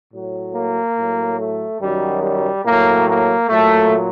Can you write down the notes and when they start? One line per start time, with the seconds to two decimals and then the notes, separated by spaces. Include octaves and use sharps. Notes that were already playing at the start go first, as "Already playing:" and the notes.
0.13 A2 F#3
0.55 A#3
0.97 A2 F#3
1.39 A3
1.81 F#2 D#3 F#3 G3
2.23 G3
2.65 A2 F#3 A#3
3.08 A#3
3.49 A#2 F#3 A3